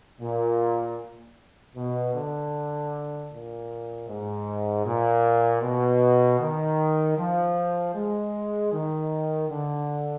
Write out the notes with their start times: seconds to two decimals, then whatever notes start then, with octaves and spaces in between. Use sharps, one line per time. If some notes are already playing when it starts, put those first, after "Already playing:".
0.21 A#2
1.76 B2
2.14 D3
3.31 A#2
4.07 G#2
4.85 A#2
5.62 B2
6.40 D#3
7.17 F3
7.94 G#3
8.72 D#3
9.49 D3